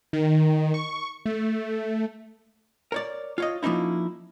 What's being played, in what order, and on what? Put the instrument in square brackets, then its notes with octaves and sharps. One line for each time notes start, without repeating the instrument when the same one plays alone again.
[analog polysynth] D#3
C#6
A3
[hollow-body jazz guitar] A#4 C#5 D5
F4 C#5 D#5
F3 A#3 C#4 D#4 E4